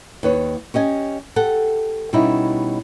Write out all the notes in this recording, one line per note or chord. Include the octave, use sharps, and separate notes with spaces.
D#2 B4 C#5
C#4 G4 D#5 G#5
G4 A4 F#5
B2 G3 C#4 D#4 E4